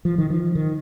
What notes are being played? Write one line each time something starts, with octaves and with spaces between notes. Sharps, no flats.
F3
D#3
F3
D#3